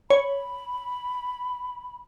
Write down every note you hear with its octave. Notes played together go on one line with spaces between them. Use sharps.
C#5 B5